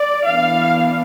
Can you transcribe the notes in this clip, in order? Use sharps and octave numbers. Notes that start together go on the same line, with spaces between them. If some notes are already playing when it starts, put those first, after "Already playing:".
Already playing: D5
E3 B3 D4 F5